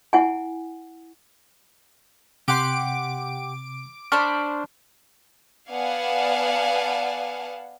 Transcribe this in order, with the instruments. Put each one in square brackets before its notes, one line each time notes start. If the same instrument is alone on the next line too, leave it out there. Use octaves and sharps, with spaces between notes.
[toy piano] E4 F#5 G#5
[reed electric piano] C3 [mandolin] G4 F#5 C6 [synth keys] D6 D7
[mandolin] D4 C5 B5 [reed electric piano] A5 C#6 F6
[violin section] B3 D5 F5 F#5 G#5 A5